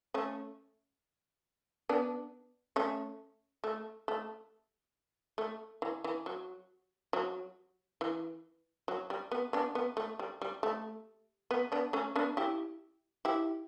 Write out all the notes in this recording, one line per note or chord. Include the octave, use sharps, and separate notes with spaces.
A3 C#4
B3 D4
A3 C#4
A3
A3
A3
E3
E3
F#3
F#3
E3
F#3
G3
B3
B3 D4
B3
A3
G3
G3
A3
B3
B3 D4
A3 C#4
B3 D4
E4 G4
E4 G4